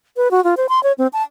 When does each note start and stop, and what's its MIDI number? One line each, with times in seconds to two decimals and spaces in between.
0.17 0.31 71
0.31 0.43 66
0.44 0.55 65
0.57 0.67 72
0.69 0.82 84
0.83 0.92 73
0.98 1.07 60
1.13 1.23 81